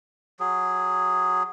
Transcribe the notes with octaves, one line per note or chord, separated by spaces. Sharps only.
F#3 G#4